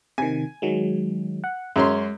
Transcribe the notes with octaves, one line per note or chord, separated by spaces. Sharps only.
C3 D#3 G#5
D#3 F#3 G#3
F#5
F#2 G#3 C#4 C6